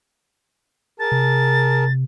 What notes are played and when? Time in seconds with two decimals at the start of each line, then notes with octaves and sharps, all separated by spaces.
1.00 G#4 A#4 A5 A6
1.12 C3